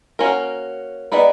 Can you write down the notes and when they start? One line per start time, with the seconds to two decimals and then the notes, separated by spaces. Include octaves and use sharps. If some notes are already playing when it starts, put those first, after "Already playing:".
0.19 A#3 C#4 F#4 A#4
1.12 B3 D#4 G#4 B4 D5